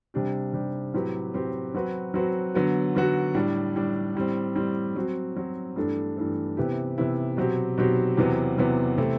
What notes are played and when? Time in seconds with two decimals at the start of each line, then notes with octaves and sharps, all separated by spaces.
0.14 C3 G3 D4 G4
0.53 C3 G3 D4 G4
0.94 A2 F#3 C4 G4 B4
1.34 A2 F#3 C4 G4 B4
1.74 F#3 C4 F#4 B4
2.14 F#3 C4 F#4 B4
2.54 D3 F#3 B3 F#4
2.95 D3 F#3 B3 F#4
3.35 A2 G3 D4
3.76 A2 G3 D4
4.15 A2 G3 C4
4.56 A2 G3 C4
4.96 F#3 C4 F#4
5.36 F#3 C4 F#4
5.76 G2 E3 A3 D4 A4
6.16 G2 E3 A3 D4 A4
6.57 C3 E3 B3 E4 G4
6.98 C3 E3 B3 E4 G4
7.37 B2 F#3 C4 G4
7.78 B2 F#3 C4 G4
8.17 E2 C3 F#3 B3
8.58 E2 C3 F#3 B3
8.98 C3 E3 A3 E4